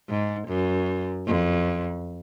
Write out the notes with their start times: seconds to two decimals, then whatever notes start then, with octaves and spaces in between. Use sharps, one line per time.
0.09 G#2
0.48 F#2
1.27 F2